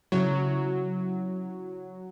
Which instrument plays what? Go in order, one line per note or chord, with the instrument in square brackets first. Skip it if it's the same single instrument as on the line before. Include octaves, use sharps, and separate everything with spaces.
[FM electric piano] C#3 E4 [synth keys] F#3